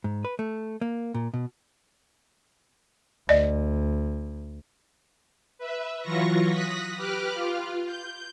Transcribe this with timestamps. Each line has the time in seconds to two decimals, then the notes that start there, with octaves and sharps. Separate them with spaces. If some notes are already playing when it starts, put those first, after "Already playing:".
0.04 G#2
0.25 B4
0.39 A3
0.81 A#3
1.14 A#2
1.34 B2
3.29 D2 D5 D#5
5.58 B4 E5
6.01 E3 F#3 F4 C#6 A#6
6.47 D#6 F#6 A#6 B6
6.96 G4 B4 D6 F6 F#6
7.34 F4
7.85 G6